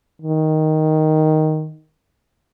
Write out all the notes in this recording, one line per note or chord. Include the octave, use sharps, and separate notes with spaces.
D#3